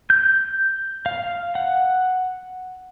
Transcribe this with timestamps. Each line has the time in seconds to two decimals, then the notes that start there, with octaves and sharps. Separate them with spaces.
0.10 G6
1.06 F5
1.55 F#5